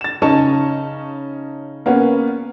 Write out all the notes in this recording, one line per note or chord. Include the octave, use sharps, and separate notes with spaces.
A6 E7
C#3 C#4 D#4 A5 C#6 E7
A#3 B3 C#4